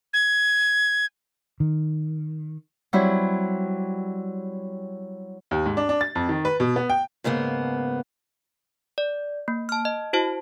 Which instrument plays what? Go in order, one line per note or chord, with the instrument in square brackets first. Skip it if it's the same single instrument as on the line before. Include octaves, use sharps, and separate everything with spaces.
[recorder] G#6
[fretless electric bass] D#3
[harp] F#3 G3 C4 E4
[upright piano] D#2
G#2
D4
D4
A6
F2
D#3
B4
B2
B3
G5
[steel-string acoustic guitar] G#2 C#3 A#3 B3
[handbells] D5
A#3
A5 F6
D#5
E4 F#4 C5 A5